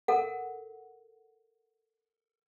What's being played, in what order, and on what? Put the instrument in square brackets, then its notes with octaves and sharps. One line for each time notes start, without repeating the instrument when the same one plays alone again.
[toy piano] A4 A#4 F#5